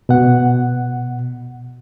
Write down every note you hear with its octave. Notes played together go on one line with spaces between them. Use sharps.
B2 F#5